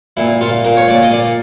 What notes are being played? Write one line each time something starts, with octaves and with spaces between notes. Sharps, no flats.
A#2 E4
A#2 F4
A#2 A#4
C#5
A#2 D5
D#5
A#2 D5